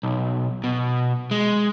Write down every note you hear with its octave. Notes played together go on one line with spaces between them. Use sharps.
B1
B2
G#3